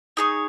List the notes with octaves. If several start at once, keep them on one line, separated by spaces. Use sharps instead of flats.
D#4 G#4 C#5